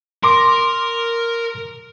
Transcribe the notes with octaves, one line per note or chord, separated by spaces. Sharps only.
A#4 C6 D6